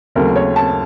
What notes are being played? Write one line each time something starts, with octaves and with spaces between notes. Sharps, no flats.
D#2 C#3 F#3 A3 C4 A#4
C#5
A5